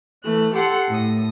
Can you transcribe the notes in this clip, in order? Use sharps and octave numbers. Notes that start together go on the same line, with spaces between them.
E3 A3 F#6
G4 A4 F#5 C6
A2 D#6